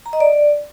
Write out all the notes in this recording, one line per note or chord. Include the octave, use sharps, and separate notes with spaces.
A#5
D#5
D5